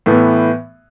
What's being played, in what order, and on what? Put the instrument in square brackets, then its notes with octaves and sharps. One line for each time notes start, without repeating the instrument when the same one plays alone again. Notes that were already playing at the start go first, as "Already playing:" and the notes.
[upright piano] A2 E3 B3